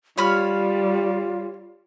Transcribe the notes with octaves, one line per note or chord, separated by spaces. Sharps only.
G3 F4 C#5 B5 F6